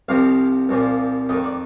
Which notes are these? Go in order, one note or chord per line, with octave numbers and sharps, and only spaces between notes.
C2 C3 F3 F5
C2 A#2 F3
F2 D#3 D#5
D5